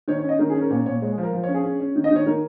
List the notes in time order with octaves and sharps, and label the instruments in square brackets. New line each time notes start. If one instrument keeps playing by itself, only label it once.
[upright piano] D#3 C#5
C#5
C#4
D#5
D#3 A#4
G#4
C#4
A#4
A#2 C#5
A#2 C#5
G#3 C#5
G#4
F3
A#4
F3
C#5
C#4
G#4
C#4
C#4
D#3
D#5
D#3 C#5
D#3 A#4